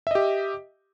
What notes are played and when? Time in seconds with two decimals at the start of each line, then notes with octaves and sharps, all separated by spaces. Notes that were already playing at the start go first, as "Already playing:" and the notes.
0.07 E5
0.11 D#5
0.15 G4